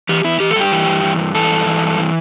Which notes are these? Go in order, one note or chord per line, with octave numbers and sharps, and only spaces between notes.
E3 G4
E2 E4
E3 G4
A4
G2 G4
E3
G2
E3
G2
E3 A4
G2
E3
G2
E3